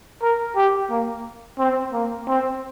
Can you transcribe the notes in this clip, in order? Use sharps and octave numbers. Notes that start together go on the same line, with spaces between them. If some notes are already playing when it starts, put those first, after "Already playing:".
A#4
G4
A#3
C4
A#3
C4